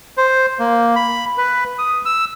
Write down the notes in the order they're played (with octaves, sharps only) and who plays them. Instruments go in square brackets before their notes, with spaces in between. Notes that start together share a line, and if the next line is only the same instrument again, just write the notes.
[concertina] C5
A#3
B5
B4
D#6
E6